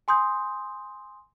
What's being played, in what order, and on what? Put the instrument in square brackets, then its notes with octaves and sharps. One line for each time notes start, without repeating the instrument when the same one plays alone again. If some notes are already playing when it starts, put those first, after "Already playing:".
[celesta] G#5 C6 D#6 G6